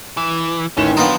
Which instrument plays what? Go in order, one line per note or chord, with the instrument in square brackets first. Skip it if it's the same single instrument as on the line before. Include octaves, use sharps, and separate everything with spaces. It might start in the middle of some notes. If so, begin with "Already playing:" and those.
[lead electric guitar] E3
[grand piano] A1 A2 E7 [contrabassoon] D#3 [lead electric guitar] C#4
[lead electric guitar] F3 F#3 [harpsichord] B3 D#4 [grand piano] D4 F5 G5